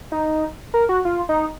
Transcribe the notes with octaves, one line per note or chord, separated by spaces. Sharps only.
D#4
A#4
F#4
F4
D#4